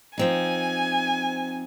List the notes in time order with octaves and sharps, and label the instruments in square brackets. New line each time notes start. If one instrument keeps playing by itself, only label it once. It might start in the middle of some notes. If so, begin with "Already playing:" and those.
[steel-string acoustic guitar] F3 C4 D#4 [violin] G#5